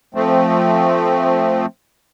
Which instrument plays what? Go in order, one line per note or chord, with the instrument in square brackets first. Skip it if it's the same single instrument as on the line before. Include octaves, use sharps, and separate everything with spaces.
[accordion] F3 A3 C4